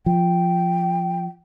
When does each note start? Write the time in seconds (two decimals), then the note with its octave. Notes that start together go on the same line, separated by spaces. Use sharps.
0.06 F3 G5